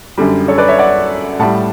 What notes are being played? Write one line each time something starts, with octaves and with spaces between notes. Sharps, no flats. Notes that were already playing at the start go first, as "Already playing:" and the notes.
F#2 D3 G3
A4 C#5
B4 D5
C#5 E5
D5 F#5
A2 G3 F#5 A5